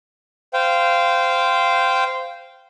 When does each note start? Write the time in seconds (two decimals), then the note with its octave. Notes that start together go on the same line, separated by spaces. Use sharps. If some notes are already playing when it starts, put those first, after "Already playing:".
0.53 C5 F5 G5